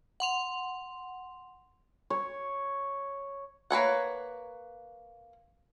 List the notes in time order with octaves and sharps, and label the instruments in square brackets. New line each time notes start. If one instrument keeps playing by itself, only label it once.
[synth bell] F#5 C6 F7
[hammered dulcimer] C#5
[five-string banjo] A#3 B4 C#5 F#5